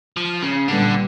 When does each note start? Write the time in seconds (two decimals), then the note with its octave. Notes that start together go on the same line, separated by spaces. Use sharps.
0.17 F3
0.42 C#3
0.68 A#2 D3 G3 B3